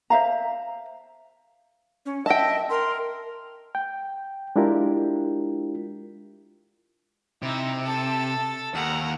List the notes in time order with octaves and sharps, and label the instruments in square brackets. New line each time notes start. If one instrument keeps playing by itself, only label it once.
[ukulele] C5 E5 F5 A#5
[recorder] C#4
[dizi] D#5 [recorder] E5 [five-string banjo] G5 A5
[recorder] A#4 [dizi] C6
[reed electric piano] G5
G#3 D4 E4 F4 G4 A#4
[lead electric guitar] C3 [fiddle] D#4 E4
[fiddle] A4 A5
[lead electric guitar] D#2 [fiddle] F#5 A#5